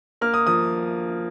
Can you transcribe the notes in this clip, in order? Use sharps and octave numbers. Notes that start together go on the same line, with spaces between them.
A#3 F6
D#6
F3 D#6